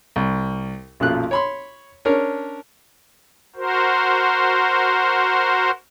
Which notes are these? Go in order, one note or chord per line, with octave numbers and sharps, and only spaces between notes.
C2
B1 F#2 A#2 F3 F4 F#6
C#5 B5 C6
C#4 D4 A#4 C#5
F#4 A#4 C5